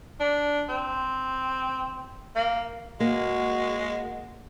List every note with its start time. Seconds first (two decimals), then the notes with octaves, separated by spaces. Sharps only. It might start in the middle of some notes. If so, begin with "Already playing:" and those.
0.20 D4
0.69 C4
2.36 A#3
3.00 G#3 A#3 F#4